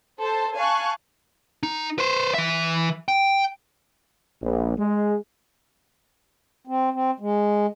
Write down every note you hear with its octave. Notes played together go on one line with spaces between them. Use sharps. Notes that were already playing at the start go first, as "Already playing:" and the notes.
A4 C5 A5
F5 G#5 A5 C#6 F#6
D#4
B4 C5
E3 E5
G5
A#1
G#3
C4
C4
G#3